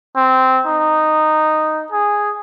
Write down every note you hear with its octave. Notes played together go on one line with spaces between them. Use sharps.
C4
D#4
G#4